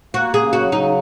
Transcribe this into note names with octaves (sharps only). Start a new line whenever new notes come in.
A#3 F#4
C#3 G#4
F#3 F#4
C#3 D#4